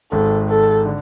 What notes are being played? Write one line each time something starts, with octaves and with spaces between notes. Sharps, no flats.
G#1 G#2 D#3 A4
A4
D3